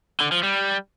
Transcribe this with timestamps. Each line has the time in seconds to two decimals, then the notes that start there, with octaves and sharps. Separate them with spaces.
0.20 D3
0.32 F3
0.43 G3